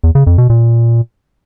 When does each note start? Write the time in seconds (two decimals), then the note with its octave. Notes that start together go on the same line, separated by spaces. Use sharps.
0.04 E2
0.15 C#3
0.27 F2
0.38 B2
0.50 A#2